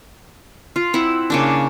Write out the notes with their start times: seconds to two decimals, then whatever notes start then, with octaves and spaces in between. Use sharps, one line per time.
0.76 F4
0.93 C4 E4 F#5
1.30 C#3 A#3 D4